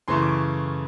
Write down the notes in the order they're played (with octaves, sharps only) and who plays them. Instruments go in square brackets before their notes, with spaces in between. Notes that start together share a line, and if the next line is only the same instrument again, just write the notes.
[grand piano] F#2 C#3 E3 A3 C6
D6